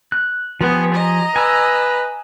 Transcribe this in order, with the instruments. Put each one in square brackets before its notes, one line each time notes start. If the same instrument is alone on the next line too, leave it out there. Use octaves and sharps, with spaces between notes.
[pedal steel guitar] F#6
[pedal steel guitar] F3 G4 G#4 [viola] B3
[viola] D#5 A#5
[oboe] B4 [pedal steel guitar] G#5 E6